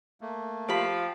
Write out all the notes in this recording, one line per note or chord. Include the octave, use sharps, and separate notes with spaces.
A3 A#3
F3 F4 G4 B5